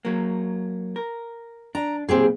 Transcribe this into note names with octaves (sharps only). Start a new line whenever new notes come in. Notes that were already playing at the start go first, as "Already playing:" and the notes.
F#3 A#3
A#4
D4 A#5
B1 A#2 C4 G4 G#4